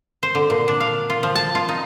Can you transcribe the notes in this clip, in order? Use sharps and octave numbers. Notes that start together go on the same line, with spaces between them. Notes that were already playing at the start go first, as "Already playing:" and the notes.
C5
D3
A#2
D4
F5
F4
F3
A5
F4
D#4